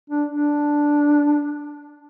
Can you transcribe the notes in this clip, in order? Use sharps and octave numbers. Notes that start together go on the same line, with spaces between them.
D4
D4